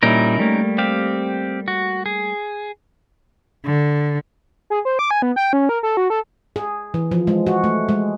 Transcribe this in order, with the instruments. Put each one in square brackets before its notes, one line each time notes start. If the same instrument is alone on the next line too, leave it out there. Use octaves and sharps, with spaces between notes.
[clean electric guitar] A#2 G3 E4 [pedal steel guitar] C#4 D#4 A#4
[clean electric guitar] G3 A3 A#3
[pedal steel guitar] C4 G4 F5
F#4
G#4
[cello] D3
[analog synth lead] G#4
C5
D6
G#5
B3
G5
C#4
A#4
A4
F#4
A4
[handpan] G#4
E3
F3
G#3
F#4
A3
G#3